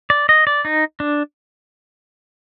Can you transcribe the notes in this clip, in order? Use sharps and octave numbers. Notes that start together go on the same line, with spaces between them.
D5
D#5
D5
D#4
D4